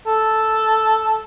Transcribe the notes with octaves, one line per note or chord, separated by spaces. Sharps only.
A4